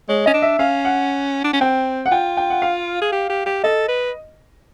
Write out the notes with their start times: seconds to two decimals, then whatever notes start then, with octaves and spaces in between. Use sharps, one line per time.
0.09 G#3 C#5
0.26 C#4 D#5
0.34 D4
0.42 E5
0.59 C#4 F5
0.85 F#5
1.44 D4
1.53 C#4
1.61 C4 G5
2.06 F#5
2.12 F4 G5
2.37 G5
2.50 F#5
2.62 F5
3.02 G#4
3.12 G4
3.30 G4
3.46 G4
3.64 A4 D#5
3.88 B4